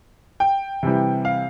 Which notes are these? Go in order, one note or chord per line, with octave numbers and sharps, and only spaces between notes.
G5
C3 E3 G3
F5